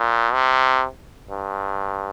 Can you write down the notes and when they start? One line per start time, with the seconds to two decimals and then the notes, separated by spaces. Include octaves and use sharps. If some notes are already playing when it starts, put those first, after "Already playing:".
Already playing: A#2
0.33 C3
1.31 G2